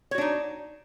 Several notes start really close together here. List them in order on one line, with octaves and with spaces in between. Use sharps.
C#5 F#4 D4 D#4